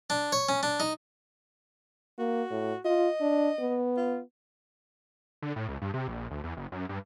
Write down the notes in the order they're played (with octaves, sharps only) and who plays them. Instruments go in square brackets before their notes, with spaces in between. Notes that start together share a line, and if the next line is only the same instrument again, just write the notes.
[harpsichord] D4
C#5
C#4
D4
D#4
[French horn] A#3 [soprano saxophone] F#4
[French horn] A2
[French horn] F4 [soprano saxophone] D#5
[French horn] D4
B3
[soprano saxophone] F4
[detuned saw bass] D3
A2
C#2
G2
C3
A#1
D2
E2
F#1
F#2
G2